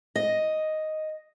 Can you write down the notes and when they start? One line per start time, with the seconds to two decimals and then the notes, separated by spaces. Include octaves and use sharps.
0.16 D#5